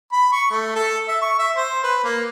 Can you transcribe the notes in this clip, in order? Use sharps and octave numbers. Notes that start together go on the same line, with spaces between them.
B5
C#6
A3
A4
E5
C#6
E5
C5
B4
A#3